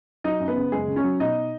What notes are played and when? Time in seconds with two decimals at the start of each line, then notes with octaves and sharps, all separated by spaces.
0.24 F#3 D#4 D#5
0.40 F#2
0.48 B3 B4
0.57 C#3
0.72 F#1 G#3 G#4
0.88 C#3
0.96 C#4 C#5
1.04 F#3
1.20 B2 D#4 D#5